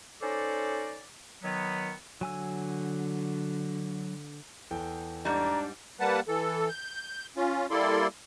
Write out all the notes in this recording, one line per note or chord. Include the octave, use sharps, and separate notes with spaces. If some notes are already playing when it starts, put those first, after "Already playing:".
C#4 D#4 A4 C5 D5
D#3 F#3 B3
D3 F#3 G#5 E6
E2 A4 G5
G#2 G3 D4 A#5
G3 A#3 B4 F#5 A5
E3 A4
G6
C#4 F4
G3 A#3 E4 A4 D5 C6